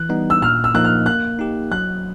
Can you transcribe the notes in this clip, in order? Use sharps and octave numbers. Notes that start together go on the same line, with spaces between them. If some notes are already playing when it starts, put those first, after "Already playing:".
Already playing: E3 F#6
G3 B3 D#4
E6
A#2 F6
E6
F3 A#3 D#4 F#6
F6
A#3 F#6
D#4 G4
F#3 F#6